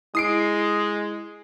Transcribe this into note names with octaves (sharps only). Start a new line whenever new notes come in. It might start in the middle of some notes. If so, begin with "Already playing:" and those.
G#3 E4 D#6 C7 D7